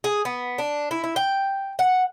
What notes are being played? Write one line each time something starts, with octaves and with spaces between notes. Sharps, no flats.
G#4
B3
D4
E4
E4
G5
F#5